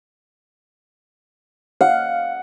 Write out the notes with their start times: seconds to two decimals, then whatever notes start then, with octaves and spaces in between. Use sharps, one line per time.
1.81 F5 F#5